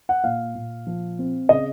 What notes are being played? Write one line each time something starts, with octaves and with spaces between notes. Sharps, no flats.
F#5
A#2 F5
A#2
F3
C4
C#3 D#5